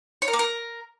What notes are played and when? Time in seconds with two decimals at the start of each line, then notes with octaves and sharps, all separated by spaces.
0.22 C#5
0.28 A#4
0.33 A#3
0.39 A#4